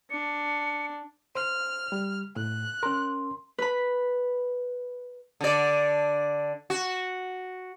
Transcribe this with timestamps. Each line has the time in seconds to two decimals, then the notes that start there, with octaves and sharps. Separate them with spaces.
0.10 D4 C#7
1.35 C5 F6
1.92 G3
2.36 A2 F#6
2.83 C#4 A#4 C6
3.58 B4 B5
5.41 D3 D5
6.70 F#4